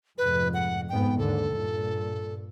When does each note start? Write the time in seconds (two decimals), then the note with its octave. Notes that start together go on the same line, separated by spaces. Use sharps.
0.18 F1 F2 G#2 B4
0.54 F#5
0.89 F2 G#2 B3 G5
1.18 D#2 G#2 D3 A4
1.49 G2 A#2